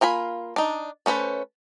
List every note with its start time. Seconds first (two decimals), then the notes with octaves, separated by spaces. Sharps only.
0.01 A#3 F4 G#5 B5
0.56 D4 D#4
1.06 A3 C#4 B4 C5